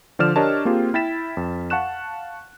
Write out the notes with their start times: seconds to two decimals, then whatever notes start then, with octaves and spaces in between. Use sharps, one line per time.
0.19 D3 F3 D5 F6 E7
0.36 D4 G4 A#4 C#5 D#5 A5
0.65 A#3 C4 F4 G4 G#4
0.94 E4 G5 A6 B6 E7
1.37 F2
1.70 F5 F#5 A5 C#6 F#6 E7